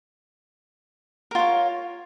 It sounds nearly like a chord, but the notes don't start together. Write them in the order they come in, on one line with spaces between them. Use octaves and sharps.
A#4 F4 C#5